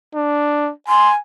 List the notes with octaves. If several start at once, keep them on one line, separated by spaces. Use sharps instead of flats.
D4
G#5 C6